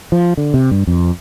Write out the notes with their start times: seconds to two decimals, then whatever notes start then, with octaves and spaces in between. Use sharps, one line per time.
0.12 F3
0.37 D3
0.54 C3
0.71 G2
0.87 F2